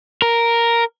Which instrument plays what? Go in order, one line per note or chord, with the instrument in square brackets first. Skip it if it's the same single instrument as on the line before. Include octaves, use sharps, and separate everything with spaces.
[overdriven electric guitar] A#4